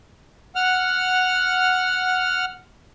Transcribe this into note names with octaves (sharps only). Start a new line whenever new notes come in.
F#5 F6